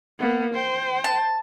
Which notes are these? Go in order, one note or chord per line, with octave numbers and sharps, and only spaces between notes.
A#3 B3
C5 G5
A5